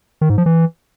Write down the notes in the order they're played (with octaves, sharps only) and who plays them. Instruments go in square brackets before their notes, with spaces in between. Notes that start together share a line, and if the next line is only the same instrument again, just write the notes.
[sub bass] D#3
G#2
F3
E3